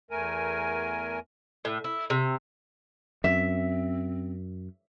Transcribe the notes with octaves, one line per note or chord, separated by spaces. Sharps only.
E2 A3 A#4 G#5
A2
E4
C3
F#2 C4 E5